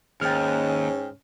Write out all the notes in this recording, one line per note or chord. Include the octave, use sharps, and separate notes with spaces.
D#2 G#2 C#4 G5 F6